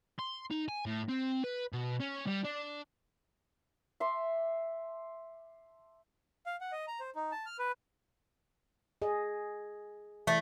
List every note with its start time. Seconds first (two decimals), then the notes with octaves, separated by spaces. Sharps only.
0.19 C6
0.51 D#4
0.68 G#5
0.86 A2
1.09 C4
1.44 B4
1.73 B2
2.01 C#4
2.27 G3
2.45 D4
4.00 E5 A5 C6 D6
6.46 F5
6.61 F#5
6.72 D#5
6.88 A#5
7.00 C5
7.15 D#4
7.32 A5
7.46 F6
7.59 B4
9.02 G#4 D#5
10.27 E3 A3